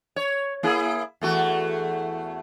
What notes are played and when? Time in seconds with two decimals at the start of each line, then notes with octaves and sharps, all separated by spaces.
0.16 C#5
0.63 A#3 E4 G#4
1.21 E2 A3 F#4